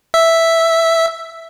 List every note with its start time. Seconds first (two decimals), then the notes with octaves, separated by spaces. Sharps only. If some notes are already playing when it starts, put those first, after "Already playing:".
0.14 E5